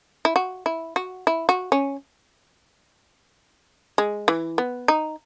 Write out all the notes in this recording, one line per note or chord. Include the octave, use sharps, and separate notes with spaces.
E4
F#4
E4
F#4
E4
F#4
C#4
G#3
E3
B3
D#4